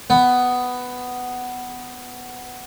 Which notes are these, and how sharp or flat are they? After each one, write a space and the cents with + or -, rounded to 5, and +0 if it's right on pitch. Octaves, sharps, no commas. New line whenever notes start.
B3 +10